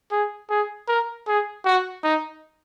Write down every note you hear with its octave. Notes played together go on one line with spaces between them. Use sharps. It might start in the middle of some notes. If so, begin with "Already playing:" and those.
G#4
G#4
A#4
G#4
F#4
D#4